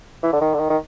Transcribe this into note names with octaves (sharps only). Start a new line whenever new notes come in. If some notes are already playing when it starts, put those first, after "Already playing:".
E3
D3
D#3
D3
D#3
D#3